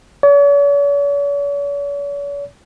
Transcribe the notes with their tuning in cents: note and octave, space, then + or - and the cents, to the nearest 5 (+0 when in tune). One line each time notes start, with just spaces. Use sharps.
C#5 +45